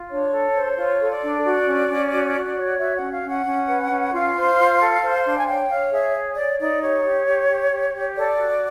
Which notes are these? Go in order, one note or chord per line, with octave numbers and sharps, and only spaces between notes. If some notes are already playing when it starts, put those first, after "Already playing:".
Already playing: F4
D4 C#5
A4
C5
F4 C#5
A4
D5
D4
F#4
C#4
C#4
F#4
F#4
C#5
F#4 E5
F#5
C#4
F5
C#4
F#5
C#4
B4
C#4
F4 F5
C5
F4
A4
C5
D4
G#5
C#5 G5
C#5 F5
G#4 E5
C#5
C#5 D5
D#4 D5
G4 C#5
G4
G4
G4
G4
G4
A4 D5
F#4